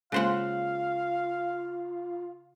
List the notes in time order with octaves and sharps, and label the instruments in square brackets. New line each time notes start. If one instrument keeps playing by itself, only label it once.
[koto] C#3 C5 F#5 [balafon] G#3 A#3 [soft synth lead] F4 [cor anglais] F5